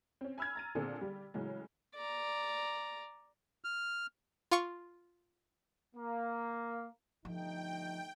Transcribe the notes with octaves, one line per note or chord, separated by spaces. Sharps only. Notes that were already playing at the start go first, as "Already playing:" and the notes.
C4 C#4
G#5 B5 E6 F6 G#6
A#5 A6 D#7
A#2 D3 C4 G#4 A4
G3 G4
A2 C#3 E3 F#3 G#3
D5 A#5
F6
F4 C#6
A#3
G1 F3 A3 D#4 G5